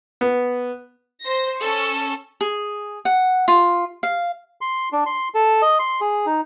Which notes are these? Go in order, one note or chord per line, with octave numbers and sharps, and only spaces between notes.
B3
C5 A#6
C#4 A4 C#6
G#4
F#5
F4
F5
C6
D4
C6
A4
D#5
C6
G#4
D#4